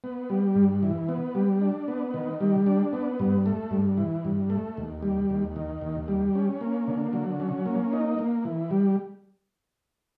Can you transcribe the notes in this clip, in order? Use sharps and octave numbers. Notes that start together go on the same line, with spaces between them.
B3
G3
G2
E3
B3
G3
D4
B3
D#3
G3
D4
B3
G2
A3
G2
E3
G2
A3
D#2
G3
D#2
D#3
D#2
G3
C#4
A#3
D3
F#3
C#4
A#3
D#4
A#3
E3
G3